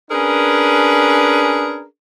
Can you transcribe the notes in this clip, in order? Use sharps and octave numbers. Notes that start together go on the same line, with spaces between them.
C#4 D4 G#4 A#4 B4